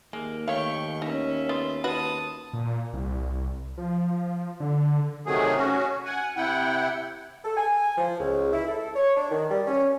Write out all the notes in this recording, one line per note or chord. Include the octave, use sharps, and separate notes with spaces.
D#2 G#3 A#3
D#3 A3 C#5 F5 G5 C#6
C#4 D#4 E5
B3 F4
D#2 F#4 B4 A5 D#6
A#2
C2
F3
D3
C3 D#3 F#3 A3 G#4
C#4 F#4
F#5 G#5
C3 E4 F#5 G5
A4
G#5
F3
C#2
E4
A4
C#5
D4
D#3
G3
C#4